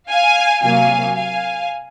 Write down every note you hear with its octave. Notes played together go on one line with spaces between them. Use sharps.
F5 G#5
C3 F#3 A#3 F5 G#5
F5 G#5